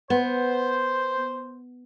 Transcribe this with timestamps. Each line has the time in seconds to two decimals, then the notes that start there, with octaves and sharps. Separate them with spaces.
0.10 B3 C5